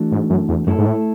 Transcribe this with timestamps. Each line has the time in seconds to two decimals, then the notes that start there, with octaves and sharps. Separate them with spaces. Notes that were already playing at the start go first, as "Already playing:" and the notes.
Already playing: E3 A3 D4 F#4 A4
0.12 G#2
0.30 F#2
0.49 E2
0.67 F#2 A3 E4 A4
0.78 G#2
0.86 A2